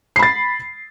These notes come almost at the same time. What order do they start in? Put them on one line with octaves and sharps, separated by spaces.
C7 B5 A6